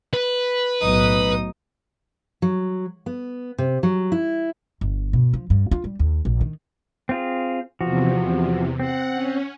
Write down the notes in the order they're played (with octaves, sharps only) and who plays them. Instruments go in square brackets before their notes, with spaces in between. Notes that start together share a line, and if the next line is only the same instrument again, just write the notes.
[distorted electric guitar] B4
[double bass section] B1 A2 [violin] D#4 D#6
[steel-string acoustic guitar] F#3
B3
C3
F#3
E4
[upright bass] G1
B2
F3
G2
F4
G3
D#2
A#1
D#3
[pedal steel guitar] C4 F4 G#4
[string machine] E2 C3 [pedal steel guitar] F3 F#4
[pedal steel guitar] C4 [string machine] F#5
[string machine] C#4